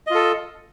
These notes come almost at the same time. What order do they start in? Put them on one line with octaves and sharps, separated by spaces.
D#5 F4 A4